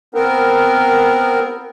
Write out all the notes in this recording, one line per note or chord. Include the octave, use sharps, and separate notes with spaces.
B3 C4 A#4